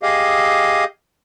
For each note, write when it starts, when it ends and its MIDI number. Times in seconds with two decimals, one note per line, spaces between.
0.03 0.84 67
0.03 0.84 68
0.03 0.84 75
0.03 0.84 77